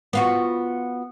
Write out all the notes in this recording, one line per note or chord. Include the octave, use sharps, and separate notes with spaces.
B3 F4 F#4